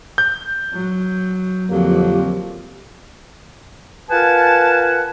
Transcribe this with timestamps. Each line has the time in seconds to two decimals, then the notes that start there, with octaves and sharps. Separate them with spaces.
0.18 G6
0.73 F#3
1.70 F2 D3 F3 F#3 A#3 G4
4.11 F4 A#4 B4 F#5 G#5 A5